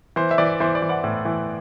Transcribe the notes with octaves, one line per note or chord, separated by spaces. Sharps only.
E3 C5
E5
E3 D5
E3 C5 E5
D5
E3
D5 F#5
A2
E3